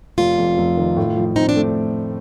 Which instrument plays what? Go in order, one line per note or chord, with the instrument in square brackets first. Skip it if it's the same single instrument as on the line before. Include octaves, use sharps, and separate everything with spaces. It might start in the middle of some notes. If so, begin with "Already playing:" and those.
[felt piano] F1 [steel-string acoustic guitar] F4
[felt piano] F2
F1
D#3
A2
F3
[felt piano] C4 [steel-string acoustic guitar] D#4
[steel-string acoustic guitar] D4
[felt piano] A3